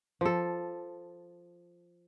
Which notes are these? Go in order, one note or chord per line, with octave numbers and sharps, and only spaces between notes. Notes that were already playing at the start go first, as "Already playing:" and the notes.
F3 A4